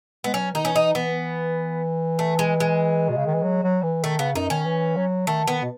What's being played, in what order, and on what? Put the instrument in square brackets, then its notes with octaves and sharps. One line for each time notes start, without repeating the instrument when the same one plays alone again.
[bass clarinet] G#3 [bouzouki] B3
[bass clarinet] F#3 [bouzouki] C#4
[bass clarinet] D#3 [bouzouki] D#4
[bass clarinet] E3 [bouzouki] C#4
[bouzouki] D#4
[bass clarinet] E3 [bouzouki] B3
[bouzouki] A3
G#3
G#3
[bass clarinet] B2
C#3
D#3
E3
F#3
F#3
E3
[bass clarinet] D#3 [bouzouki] A3
[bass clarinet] C#3 [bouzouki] B3
[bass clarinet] F#2 [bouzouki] D#4
[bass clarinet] D#3 [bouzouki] C#4
[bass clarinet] E3
F#3
[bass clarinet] D#3 [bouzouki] A3
[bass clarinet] D#3 [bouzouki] B3
[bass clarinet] B2